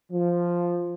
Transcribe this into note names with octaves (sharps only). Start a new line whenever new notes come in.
F3